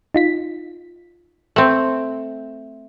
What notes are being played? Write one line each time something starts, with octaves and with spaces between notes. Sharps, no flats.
D#4 F4 B6
A3 C4